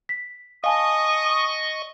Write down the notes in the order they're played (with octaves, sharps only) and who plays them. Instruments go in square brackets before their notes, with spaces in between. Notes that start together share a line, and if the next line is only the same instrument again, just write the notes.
[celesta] B6
[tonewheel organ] D#5 C#6 [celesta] F5 G#5 A5 [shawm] D#6